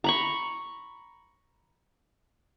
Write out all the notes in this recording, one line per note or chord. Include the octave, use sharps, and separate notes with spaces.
A#5 B5 C#6